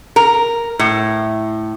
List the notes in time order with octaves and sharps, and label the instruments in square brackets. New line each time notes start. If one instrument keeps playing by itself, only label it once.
[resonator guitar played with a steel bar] A#4
A2